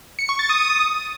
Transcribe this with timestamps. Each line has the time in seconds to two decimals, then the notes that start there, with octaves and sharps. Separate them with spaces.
0.19 C#7
0.29 C#6
0.39 A6
0.49 D#6